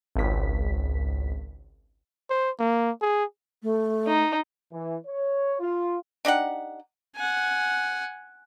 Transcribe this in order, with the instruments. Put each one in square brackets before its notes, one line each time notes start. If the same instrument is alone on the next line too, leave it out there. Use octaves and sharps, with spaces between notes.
[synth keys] G#1 C#2 B6
[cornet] C5
A#3
G#4
[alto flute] A3
[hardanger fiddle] D#4
[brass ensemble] E3
C#5
F4
[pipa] D4 D#4 G4 F#5
[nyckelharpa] F#5 G#5